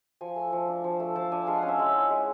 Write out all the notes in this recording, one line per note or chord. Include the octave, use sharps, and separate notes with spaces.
F3 G#5
A3
F3
D4
F3
A3
F3 A5
D4 G#5
G#3 F5
C#4 F#5
E5
G#3
E4
G#3